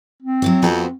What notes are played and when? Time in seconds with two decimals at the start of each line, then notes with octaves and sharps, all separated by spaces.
0.22 C4
0.42 F#3 E4 C#5
0.63 F2 B3 F#4 C5